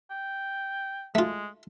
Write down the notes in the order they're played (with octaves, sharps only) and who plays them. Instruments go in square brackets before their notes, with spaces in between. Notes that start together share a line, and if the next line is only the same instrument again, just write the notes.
[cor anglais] G5
[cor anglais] G#3 [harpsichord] A3 F4